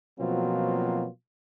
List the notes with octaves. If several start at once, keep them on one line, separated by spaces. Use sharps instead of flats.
B2 F3 F#3 A#3 C4 F4